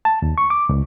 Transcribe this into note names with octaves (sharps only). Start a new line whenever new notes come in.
A5
D#2
C#6
D6
C#2